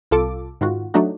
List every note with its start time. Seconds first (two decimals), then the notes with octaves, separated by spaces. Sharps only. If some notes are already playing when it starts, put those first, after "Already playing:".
0.11 C2 F4 A4 D6
0.61 G#2 D#3 F4 F#4
0.94 F#3 A3 D4 D#4 F#4